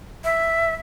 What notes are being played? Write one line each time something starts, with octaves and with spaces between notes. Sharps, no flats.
E5